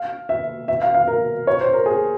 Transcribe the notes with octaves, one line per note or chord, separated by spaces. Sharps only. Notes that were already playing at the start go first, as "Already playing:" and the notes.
Already playing: F5
E5
E5
F5
F5
A#4
C#5
C5
A#4
G#4